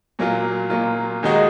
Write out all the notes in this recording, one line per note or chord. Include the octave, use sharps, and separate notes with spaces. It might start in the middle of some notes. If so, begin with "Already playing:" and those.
A#2 F#3 A#3 F4
A#2 F#3 A#3 F4
D#2 D#3 G#3 D#4 F#4